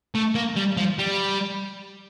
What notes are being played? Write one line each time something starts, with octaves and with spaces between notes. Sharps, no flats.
A3
A#3
G3
F3
G3